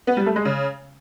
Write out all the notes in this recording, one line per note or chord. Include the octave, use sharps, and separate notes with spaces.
B3
G3
A3
G#3
C#3